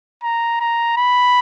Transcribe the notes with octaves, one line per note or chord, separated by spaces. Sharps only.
A#5
A#5
B5